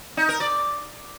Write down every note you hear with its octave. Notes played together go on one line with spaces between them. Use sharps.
D#4
A#4
D5